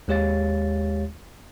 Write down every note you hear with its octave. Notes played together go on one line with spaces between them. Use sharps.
D#2 G#3 G4 C#5 F5 A6